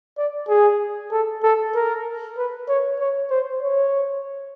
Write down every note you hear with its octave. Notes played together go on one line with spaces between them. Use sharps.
D5
G#4
A4
A4
A#4
B4
C#5
C#5
C5
C#5